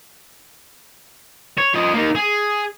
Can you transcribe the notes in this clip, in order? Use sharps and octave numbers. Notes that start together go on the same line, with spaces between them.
C#5
F3 D#5
A#3 D#4
G#4